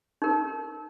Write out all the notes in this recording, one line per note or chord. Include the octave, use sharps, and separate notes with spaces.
D#4 A#4